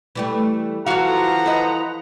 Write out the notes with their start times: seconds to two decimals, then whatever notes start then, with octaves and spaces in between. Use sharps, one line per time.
0.15 E3 G3 A3
0.86 E3 F3 F4 F#4 A4 F5 F#5 A#5
1.46 B4 D#5